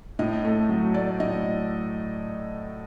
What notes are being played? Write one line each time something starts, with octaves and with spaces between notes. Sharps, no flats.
A2 D#5
A3
F#3
A3 D5
A2 D#5